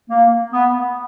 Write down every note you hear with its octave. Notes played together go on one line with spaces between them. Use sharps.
A#3
B3